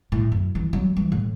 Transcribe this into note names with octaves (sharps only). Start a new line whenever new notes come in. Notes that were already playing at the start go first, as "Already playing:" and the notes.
A2
F#2
E3
F#3
E3
A2